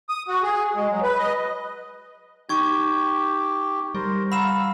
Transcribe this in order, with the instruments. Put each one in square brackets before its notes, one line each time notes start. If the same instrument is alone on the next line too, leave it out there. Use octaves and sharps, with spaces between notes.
[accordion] D#6
F#4
G#4
G#3
F#3
B4
D#5
[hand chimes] D#4 [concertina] G4 G5 [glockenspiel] C#6 G#6
[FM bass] G3 [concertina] A#4 C5
[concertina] F5 E6 [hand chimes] F#5 A#5 [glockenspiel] B5 E7